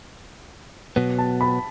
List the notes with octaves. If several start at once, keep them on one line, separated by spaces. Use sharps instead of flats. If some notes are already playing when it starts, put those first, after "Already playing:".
B2 F#3 B3
A5
B5